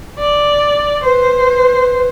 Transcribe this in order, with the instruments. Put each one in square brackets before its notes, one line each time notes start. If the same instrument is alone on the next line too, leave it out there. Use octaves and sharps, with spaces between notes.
[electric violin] D5
[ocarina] B4 [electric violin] C5